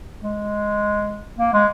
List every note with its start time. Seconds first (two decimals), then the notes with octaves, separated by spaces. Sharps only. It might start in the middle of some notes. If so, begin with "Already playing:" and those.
0.23 G#3
1.39 A#3
1.53 G#3